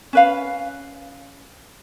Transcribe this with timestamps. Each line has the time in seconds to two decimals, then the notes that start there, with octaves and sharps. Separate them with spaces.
0.13 C#4 B4 F5